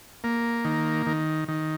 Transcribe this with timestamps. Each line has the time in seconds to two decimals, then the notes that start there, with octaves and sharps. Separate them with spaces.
0.24 A#3
0.65 D#3
1.06 D#3
1.48 D#3